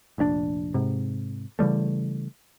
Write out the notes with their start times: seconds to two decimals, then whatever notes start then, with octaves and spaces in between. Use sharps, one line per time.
0.18 F1 A#1 C#4 D4
0.74 G#2 C3
1.59 C#3 E3 G3 A3